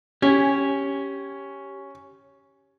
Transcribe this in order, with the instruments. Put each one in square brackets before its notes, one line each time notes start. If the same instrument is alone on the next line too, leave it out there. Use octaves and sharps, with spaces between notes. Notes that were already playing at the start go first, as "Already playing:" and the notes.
[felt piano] C#4 [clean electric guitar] G4 G#5